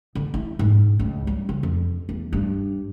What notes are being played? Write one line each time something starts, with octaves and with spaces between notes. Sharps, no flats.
D3
E4
G#2
C#2
G3
C#3
F2
E2
G2